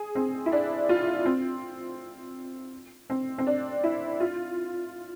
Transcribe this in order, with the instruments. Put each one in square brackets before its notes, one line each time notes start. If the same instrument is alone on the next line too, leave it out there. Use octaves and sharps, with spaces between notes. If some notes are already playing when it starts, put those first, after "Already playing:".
Already playing: [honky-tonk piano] G#4
C4
E4
D4
F4
C4
C4
C4
D4
E4
F4